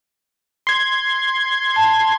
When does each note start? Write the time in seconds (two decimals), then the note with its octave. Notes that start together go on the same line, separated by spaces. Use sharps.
0.67 C6 G#6
1.76 A5